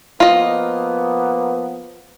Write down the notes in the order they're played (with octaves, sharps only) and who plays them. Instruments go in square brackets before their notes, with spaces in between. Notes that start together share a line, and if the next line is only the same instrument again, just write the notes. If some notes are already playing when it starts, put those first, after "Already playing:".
[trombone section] F3 A#3 B3 [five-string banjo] F4 D#5